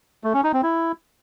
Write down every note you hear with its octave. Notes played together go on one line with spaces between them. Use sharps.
A3
C#4
D#4
C4
E4